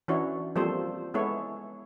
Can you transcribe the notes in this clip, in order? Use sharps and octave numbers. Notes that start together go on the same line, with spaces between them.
E3 C#4 D4 E4 F#4 C#5
F3 G3 A#3 C4 A4 C5
G#3 B3 E4 A4 C#5